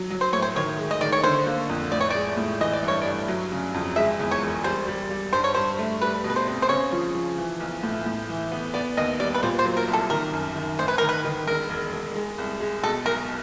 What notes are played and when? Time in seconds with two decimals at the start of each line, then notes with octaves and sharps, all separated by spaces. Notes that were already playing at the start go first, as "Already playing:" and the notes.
Already playing: F#3
0.10 F#3
0.21 C5
0.33 A2 C#5
0.42 C5
0.56 D#3 C#5
0.79 G#3
0.91 D#5
1.01 D#3 D5
1.12 C#5
1.24 D3 C5
1.46 A#3
1.69 F2
1.92 A2 D5
2.01 C#5
2.10 G#3 D5
2.37 A2
2.60 E3 D#5
2.73 D5
2.83 G2 C#5
3.02 D5
3.06 G2
3.28 F#3
3.52 C#3
3.74 F2
3.96 G#3 E5
4.20 E2
4.31 C#5
4.42 E1
4.64 G3 C5
4.88 G3
5.10 G3
5.33 G2 C5
5.44 C#5
5.55 G2 C5
5.79 A3
6.01 G3 B4
6.24 B2
6.30 B4
6.36 C5
6.47 C4
6.62 C5
6.69 C#3 C#5
6.92 F3
7.15 F3
7.38 E3
7.60 B1
7.83 A2
8.06 A2
8.29 E3
8.52 B3
8.74 B3 D5
8.97 D#2 D#5
9.20 G3 D5
9.34 B4
9.43 A#2 C5
9.59 C5
9.65 F#3
9.77 A#4
9.88 C2
9.93 A4
10.10 D#3 A#4
10.33 F#2
10.56 D#3
10.79 A1 C5
10.88 B4
10.98 D#3 A#4
11.09 B4
11.25 D#3
11.47 E1 A#4
11.69 E1
11.92 E1
12.15 G#3
12.38 C2
12.60 G#3
12.83 B2 A4
13.06 B1 A#4